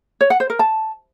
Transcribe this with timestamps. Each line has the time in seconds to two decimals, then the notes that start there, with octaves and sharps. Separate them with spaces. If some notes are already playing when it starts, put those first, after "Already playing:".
0.21 C#5
0.30 F#5
0.40 C5
0.50 A#4
0.59 A5